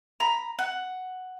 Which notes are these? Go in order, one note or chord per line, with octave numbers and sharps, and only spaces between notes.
A#5 B5
F#5